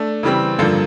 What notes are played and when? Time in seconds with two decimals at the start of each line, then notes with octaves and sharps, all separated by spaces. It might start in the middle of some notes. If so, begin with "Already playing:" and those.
Already playing: A3 D4
0.23 C#3 E3 G3 C4
0.59 G2 D3 F3 A#3